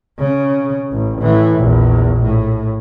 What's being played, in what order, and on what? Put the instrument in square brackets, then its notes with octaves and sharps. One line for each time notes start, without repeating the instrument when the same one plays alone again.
[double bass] C#3
A1
A2 E3
A#1 E2
A2